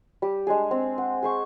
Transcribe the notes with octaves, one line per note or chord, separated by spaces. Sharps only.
G3 G4
G#3 D4 G#4
C4
F#5
G#4 C5 C#6